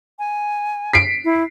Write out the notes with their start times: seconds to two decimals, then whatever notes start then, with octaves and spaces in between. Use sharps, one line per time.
0.19 G#5
0.93 B6 C7 D7
1.25 E4